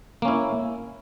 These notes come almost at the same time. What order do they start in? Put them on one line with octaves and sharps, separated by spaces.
A#3 C#4 E4